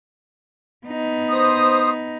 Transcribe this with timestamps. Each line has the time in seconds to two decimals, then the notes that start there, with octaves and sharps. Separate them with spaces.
0.87 B3 D#4
1.30 C5 D#6